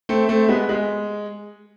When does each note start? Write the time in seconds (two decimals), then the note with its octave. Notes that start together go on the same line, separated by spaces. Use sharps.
0.09 A3 C4
0.28 A3 C4
0.49 G#3 B3
0.69 G#3